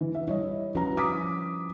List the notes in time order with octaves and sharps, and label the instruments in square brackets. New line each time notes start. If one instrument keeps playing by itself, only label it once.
[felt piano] E3
E5
[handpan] G3 E4 [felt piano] C#5 D#5
[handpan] F3 C#4 B4 [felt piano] F#4 A#5
[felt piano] D6 D#6 B6